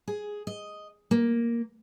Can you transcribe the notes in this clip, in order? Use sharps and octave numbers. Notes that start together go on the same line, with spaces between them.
G#4
D#5
A#3